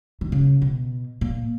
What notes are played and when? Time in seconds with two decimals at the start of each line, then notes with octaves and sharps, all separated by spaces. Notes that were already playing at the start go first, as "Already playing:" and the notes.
0.21 D#3
0.32 C#3
0.62 B2
1.21 A#2